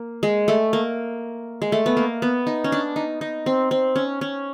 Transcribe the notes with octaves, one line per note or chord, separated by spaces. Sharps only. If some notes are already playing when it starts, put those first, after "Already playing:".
Already playing: A#3
G#3
A3
A#3
G#3
A3
B3
A#3
B3
D#4
C#4
D4
D#4
D#4
C4
C4
C#4
C#4